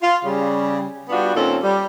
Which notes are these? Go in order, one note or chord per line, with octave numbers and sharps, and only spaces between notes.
F4
C#3 G3
G3 B3 D4 F4 F#4
A#2 D#3 C4 C#4 A4
G3